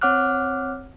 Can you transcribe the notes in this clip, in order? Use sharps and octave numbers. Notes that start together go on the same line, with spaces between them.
C4 C#5 F#5 D6 F6 F#6